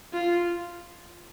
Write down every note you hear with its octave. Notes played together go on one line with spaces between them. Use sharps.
F4